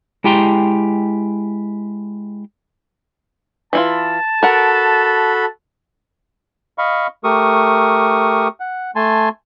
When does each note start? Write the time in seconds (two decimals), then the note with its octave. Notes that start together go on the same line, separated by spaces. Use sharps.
0.24 G#3 E4 G4 G5 A#5 C6
3.73 E3 E4 F4 A5
4.43 F#4 A4 A#4 F#5 B5
6.78 D#5 F5 B5 C#6
7.24 A3 G4 A#4 C#6 D#6
8.60 F#5
8.96 A3 G#5 A5 C6